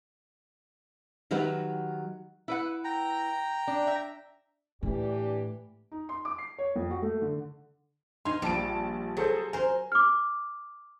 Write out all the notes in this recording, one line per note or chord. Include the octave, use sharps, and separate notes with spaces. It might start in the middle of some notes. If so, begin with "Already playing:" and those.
D#3 F#3 G4 B4 E5 F#5
E4 B4 F#5
G5 A#5
D4
E5
A2 E3 D4 G4
D#4
C6
D6
C7
C#5
F2
F#4
A3
D3
D#4 F5 G#5 C6
A#1 G3 A5 D7
F#3 G#4 A4 C5
A#4 C5 G#5
D6 F6